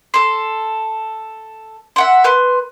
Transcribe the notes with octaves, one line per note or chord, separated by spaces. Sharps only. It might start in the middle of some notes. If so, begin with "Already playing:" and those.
A4 C6
E5 F#5 C6
B4 C6